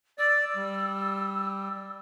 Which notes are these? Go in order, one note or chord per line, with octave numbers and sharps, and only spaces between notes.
D5 E6
G3